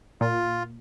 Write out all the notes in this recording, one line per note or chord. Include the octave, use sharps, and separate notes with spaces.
A#2 F4